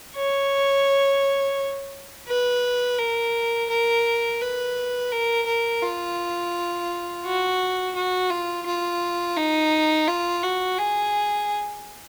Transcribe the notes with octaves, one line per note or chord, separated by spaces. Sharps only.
C#5
B4
A#4
A#4
B4
A#4
A#4
F4
F#4
F#4
F4
F4
D#4
F4
F#4
G#4